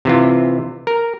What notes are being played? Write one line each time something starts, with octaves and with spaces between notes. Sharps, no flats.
C3 E3 F4
A#4